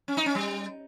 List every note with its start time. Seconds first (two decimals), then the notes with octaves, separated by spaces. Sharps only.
0.08 C#4
0.17 D#4
0.26 C#4
0.35 G3